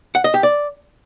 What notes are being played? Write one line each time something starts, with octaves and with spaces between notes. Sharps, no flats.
F#5
D#5
G4
D5